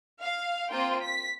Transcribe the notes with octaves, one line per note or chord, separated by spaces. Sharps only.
F5
A#3 C4 F4 G5 C6
B6